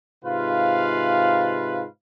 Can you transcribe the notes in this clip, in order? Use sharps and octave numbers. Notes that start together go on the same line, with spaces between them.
G#2 C3 F4 B4 F5